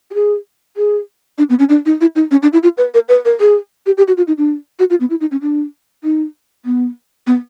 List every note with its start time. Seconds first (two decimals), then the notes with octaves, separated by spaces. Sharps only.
0.11 G4
0.14 G#4
0.77 G#4
1.38 D4
1.50 B3
1.59 C#4
1.69 D4
1.86 D#4
2.01 E4
2.16 D#4
2.31 C#4
2.43 D4
2.53 E4
2.63 F4
2.78 B4
2.94 A#4
3.09 B4
3.25 A#4
3.40 G#4
3.86 G4
3.97 G4
4.08 F#4
4.17 F4
4.28 D#4
4.38 D4
4.79 F#4
4.90 F4
5.00 B3
5.10 E4
5.21 D#4
5.31 C#4
5.42 D4
6.04 D#4
6.65 B3
7.27 B3